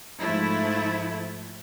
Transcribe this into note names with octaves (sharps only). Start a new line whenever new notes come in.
G#2 F3 A3 E4